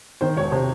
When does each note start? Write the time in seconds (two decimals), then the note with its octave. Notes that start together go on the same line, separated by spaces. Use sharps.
0.21 D#3 C5
0.37 E1 C#5
0.51 C3 C5